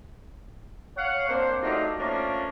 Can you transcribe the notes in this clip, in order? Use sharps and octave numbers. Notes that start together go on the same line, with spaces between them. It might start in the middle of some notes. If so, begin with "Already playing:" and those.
C#5 F5 F#5
A#3 C4 D4 C5
F#3 A3 D4 D#4 F4 G4
F3 A3 A#3 C#4 D4 F4